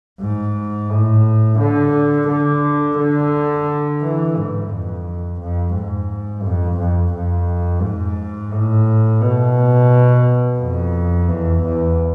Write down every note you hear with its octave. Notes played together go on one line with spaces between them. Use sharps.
G#2
A2
D3
D3
D3
E3
G#2
F2
F2
G#2
F2
F2
F2
G#2
A2
B2
F2
E2
E2